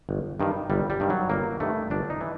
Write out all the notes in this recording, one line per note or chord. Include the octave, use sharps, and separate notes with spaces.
G1
G2 D#3
G1 G3
G3
G2 D#3
F#3
G1 A#3
G2 D#3 A3
G1 D4
D#4
E3